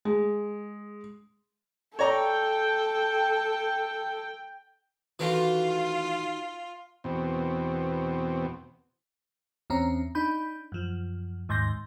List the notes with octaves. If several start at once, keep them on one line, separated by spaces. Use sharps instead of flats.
G#3
A4 C#5 D5 G5 A#5
D#3 E3 A3 F4 F#4
E2 B2 C4
E2 C4 C#4 A#5
D4 D#4 B5 G6
F#2 F3
D#2 G#2 C6 G6 A#6